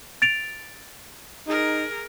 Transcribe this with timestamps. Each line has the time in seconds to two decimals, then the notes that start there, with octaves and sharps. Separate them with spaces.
0.22 A6 D7 F7
1.47 D#4 G#4 A#4